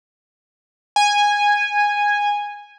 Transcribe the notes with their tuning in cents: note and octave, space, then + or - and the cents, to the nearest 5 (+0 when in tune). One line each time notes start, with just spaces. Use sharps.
G#5 -10